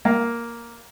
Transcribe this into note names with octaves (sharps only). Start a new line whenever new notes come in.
A#3